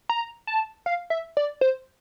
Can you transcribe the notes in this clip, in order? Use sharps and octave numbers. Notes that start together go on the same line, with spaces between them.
A#5
A5
F5
E5
D5
C5